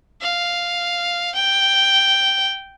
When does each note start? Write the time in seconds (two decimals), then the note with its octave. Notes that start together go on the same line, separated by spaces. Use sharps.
0.21 F5
1.35 G5